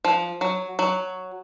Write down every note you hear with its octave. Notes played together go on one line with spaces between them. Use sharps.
F3
F#3
F#3